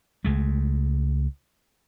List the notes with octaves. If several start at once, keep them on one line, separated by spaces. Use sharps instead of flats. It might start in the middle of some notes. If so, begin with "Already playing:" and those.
C#2 G#3 A3